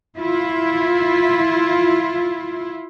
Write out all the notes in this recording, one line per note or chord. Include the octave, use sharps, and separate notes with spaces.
E4 F4